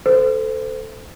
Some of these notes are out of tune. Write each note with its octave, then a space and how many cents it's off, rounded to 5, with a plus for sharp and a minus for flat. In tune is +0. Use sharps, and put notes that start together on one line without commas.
A4 +0 C5 -30